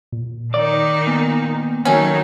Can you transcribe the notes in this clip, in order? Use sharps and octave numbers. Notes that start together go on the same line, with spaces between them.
A#2
D#3 D#4 D5
A#2 B3
D#3 F#3 A3 C#4 D#4